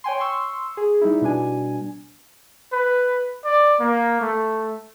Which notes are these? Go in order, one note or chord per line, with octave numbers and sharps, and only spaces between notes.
C#5 G5 G#5 C6
C6 C#6 E6
G#4
G3 D#4 E4
B2 G3 D4 G#5
B4
D5
A#3
A3